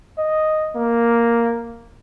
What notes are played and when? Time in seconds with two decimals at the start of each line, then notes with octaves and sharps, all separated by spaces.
0.18 D#5
0.76 A#3